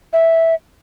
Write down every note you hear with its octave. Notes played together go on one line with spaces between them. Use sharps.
E5